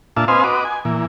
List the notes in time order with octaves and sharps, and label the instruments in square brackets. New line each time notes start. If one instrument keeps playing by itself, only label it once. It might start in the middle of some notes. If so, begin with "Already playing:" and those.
[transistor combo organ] A#2 D4 F4 E5 A5
C4 B4 C5 D#5 F5 G#5
F#4 B4 D#5 D6
G#5
A#2 E3